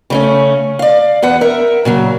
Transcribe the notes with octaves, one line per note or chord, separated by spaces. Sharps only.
C#3 A3 C#4
D5 F5
E2 B4 F#5
A#4 E5
A#2 C#3 F#3